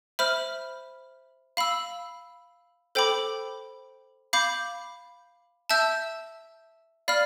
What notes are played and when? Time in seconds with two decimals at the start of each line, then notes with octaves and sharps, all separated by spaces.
0.19 C5 E5 B5 F6
1.57 F5 B5 E6
2.95 A4 C5 G5 B5 D6
4.33 F5 B5 D6 G6
5.70 E5 A5 E6 G6
7.08 D5 F5 B5 F6